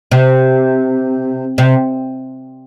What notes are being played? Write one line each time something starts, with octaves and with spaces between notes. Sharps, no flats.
C3
C3